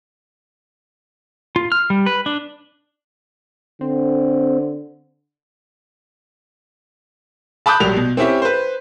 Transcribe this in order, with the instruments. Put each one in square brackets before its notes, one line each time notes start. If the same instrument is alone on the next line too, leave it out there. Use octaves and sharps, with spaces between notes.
[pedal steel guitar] F4
F6
G3
B4
D4
[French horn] D3 [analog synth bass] C4
[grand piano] A5 B5 D6 D#6 F#6 G6
A#1 F#3 G3 F7
B2
C4 C#4 E4 G4
B4 C5